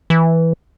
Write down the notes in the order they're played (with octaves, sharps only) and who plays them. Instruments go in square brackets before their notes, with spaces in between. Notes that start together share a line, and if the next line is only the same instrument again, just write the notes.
[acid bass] E3